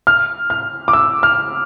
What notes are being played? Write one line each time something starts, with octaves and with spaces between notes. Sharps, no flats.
F6
F6
D6
E6
F6